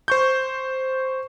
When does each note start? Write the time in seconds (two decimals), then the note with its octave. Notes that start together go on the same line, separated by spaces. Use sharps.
0.08 C5 C#6 G6